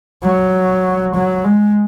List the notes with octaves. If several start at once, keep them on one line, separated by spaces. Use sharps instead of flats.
F#3
F#3
G#3